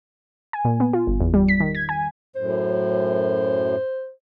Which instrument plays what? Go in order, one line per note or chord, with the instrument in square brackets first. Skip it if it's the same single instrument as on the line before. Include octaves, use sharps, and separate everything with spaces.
[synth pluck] G#5
A#2
B3
F4
G1
E2
G3
B6
D#3
G#6
G#5
[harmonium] F#2 A2 [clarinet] C5